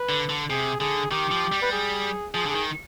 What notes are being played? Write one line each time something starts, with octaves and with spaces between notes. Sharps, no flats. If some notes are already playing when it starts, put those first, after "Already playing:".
Already playing: B4
D3
D3
C3 G#4
D3 G#4
D#3 G4
F3
G3
B4
G#4
F3 G#4
D3
G#4
D#3